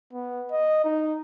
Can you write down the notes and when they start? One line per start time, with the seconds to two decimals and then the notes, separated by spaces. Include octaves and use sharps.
0.13 B3
0.51 D#5
0.84 D#4